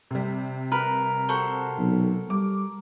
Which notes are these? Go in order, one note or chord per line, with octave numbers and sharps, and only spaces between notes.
C3 G3
A#4 B4
F#4 A4 C5
B1
G3 D6